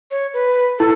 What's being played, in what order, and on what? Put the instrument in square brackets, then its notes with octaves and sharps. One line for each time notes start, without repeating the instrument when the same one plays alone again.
[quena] C#5
B4
[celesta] E4 [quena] A4